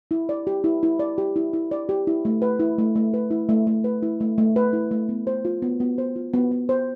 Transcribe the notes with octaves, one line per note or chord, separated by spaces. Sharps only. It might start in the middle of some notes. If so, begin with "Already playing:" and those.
E4
D5
G4
E4
E4
D5
G4
E4
E4
D5
G4
E4
A3
B4
E4
A3
A3
B4
E4
A3
A3
B4
E4
A3
A3
B4
E4
A3
B3
C5
F4
B3
B3
C5
F4
B3
B3
C5